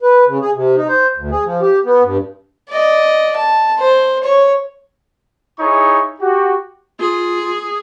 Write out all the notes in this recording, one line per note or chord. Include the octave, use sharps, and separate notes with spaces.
B4
C#3
G#4
C3
D#4
C5
D2
G#4
F3
G4
B3
G2
D5 D#5
A5
C5
C#5
D#4 E4 G#4 C#5 C#6
F#4 G4
F4 G#4